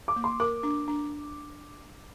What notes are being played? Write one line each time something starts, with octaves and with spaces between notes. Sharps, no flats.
D6
A#3
C6
A#4 D6
D4
D4